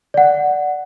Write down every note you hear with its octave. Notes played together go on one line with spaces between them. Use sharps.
D5 F#5